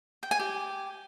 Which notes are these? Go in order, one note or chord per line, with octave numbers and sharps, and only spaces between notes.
G5
G#5
G4